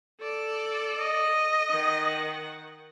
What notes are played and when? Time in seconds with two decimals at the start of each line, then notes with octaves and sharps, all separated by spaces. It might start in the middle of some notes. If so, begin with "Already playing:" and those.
0.20 A4 D5
0.99 D#5
1.70 D#3 F#5